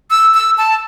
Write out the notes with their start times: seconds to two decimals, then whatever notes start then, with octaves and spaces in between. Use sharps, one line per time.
0.10 E6
0.34 E6
0.58 A5